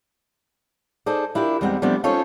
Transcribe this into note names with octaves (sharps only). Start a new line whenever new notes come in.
D#4 G#4 A4 C5 D5
D4 E4 F4 G4 A#4
E2 G3 G#3 C4 D#4 F#5
F3 G3 A3 B3 C4 D4
C#4 D#4 F4 A4 C5 C#5